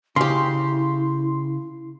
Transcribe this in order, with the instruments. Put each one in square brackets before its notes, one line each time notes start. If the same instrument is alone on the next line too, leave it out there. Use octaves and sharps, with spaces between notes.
[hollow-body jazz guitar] C#3 G4 [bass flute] E4 [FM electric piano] C6